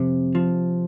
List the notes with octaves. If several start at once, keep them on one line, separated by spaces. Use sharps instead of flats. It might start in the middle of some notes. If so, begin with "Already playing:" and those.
Already playing: F2 C3
F3